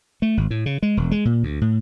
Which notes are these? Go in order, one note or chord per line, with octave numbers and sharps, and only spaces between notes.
A3
G#1
A2
C#3
G#3
E1
G#3
A#2
D2
A2